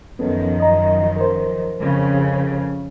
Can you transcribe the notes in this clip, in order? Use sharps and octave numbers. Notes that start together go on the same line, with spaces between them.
F#2 D#3 F3 B3 C#4 A4
D#5 A#5
A#4 C5
F2 C#3